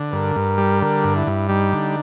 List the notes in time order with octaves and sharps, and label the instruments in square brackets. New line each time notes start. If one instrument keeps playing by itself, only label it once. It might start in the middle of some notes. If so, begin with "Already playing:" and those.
Already playing: [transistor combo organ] D3
[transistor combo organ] G2 [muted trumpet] A#4
[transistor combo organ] G2
G3
[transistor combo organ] D3 [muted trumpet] A#4
[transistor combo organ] G2
[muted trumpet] E4
[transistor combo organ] G2
[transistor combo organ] G3 [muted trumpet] D#4
[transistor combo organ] D3